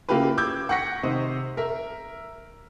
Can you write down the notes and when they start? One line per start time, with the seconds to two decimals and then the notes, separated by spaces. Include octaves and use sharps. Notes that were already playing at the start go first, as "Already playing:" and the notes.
0.09 C#3 A#3 E4 F4 G4 B4
0.38 D6 E6 G6 G#6
0.69 F#5 G5 C#6 A#6 B6 C#7
1.03 C3 D#3 C5 D#5
1.57 A#4 E5